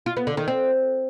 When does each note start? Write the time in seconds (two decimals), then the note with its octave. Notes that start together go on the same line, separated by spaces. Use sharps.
0.06 F4
0.17 B3
0.27 D3
0.37 D#3
0.48 C4